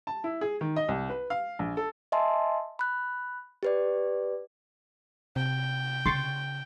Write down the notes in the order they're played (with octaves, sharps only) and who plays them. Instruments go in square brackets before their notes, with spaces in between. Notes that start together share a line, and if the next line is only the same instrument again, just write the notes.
[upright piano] A5
E4
G#4
D#3
D#5
C2
B4
F5
A#1
A4
[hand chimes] D#5 E5 G#5 A5 C6
B5 F#6
G4 B4 D5
[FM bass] C3 [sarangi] G5
[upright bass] C#3 [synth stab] C6 C#6 A6